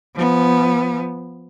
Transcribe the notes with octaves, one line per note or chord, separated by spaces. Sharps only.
F3 B3